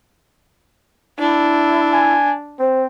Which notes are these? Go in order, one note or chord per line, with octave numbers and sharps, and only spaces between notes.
D4 E4
G#5
C4 C5